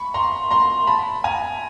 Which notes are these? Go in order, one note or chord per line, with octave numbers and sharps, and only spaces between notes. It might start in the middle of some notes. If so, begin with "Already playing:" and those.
Already playing: B5 C#6
A#5 C6
A#5 C6
A5 B5
G#5 A#5